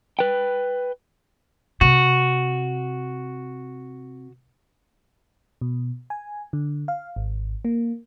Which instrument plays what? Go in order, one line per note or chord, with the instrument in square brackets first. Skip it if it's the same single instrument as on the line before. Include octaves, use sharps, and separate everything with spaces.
[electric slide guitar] B4 G5
[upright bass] C3 [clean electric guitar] F#4
[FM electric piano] B2
G#5
D3
F5
G#1
A#3